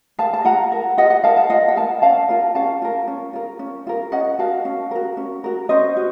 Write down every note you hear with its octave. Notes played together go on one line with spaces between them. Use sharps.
A#4 F5 A5
A5
F4 F#5 A#5
A#4
F4 D#5 F#5
D#5 F#5
A#4 F5 A5
F5 A5
F4 D#5 F#5
F#5
A#4 F5 A5
C#4 F5 A5
F4 A#4
C#4 F5 A5
F4 A#4
C#4
F4 A#4
C#4
F4 A#4
C#4 D#5 F#5
F#4 A#4 F5 A5
C#4
F#4 A#4
C#4
F#4 A#4
C#4 C5 D#5
F#4